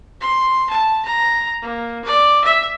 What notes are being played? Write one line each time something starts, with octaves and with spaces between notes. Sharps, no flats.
C6
A5
A#5
A#3
D5
E5